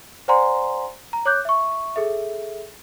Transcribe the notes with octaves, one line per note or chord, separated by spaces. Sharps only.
C5 D5 F#5 G#5 A#5 C6
A#5
C#5 D6 F#6 G6
E5 C#6
G#4 A4 E5